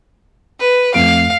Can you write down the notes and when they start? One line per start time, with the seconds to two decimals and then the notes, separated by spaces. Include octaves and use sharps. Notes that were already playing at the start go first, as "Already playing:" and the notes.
0.60 B4
0.94 F2 A3 F5 D7